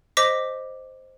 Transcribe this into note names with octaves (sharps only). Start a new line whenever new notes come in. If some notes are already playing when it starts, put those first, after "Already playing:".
C5 D#5 D6 A#6 B6